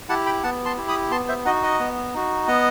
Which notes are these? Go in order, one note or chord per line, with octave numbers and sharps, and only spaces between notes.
E4 G4 F#5 A5
G5 B5
B3 F#5 A5
A5 C6
E4 G4
B5 D#6
B3 A5 C6
C5 E5
D#4 F#4 D#5 F#5
D#5 F#5
B3
D#4 F#4
B3 D#5 F#5